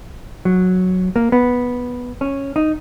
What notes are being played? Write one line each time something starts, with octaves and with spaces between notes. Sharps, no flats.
F#3
A#3
B3
C#4
D#4